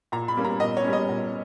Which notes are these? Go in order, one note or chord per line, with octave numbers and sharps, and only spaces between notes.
A#2 A#5
B5
G3 A#3 C#4
A#5
A#2 D#5
C#5
G3 A#3 C#4
D#5
A#2